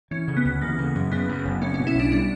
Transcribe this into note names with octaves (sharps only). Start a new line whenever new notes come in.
E3 C#4
C#3
B3
D2
E3 A#3
C#3
F#2
C#3 B3
F#2
F#1
A#3 C#4
C#4
B2
E4
B1 D4
G3 D4